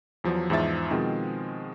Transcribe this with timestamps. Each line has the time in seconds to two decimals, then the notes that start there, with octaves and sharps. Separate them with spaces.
0.24 E2 F3 F#3
0.50 E2 G#2 F3 E5 A6
0.91 B2 D#3 F3 G#3 C4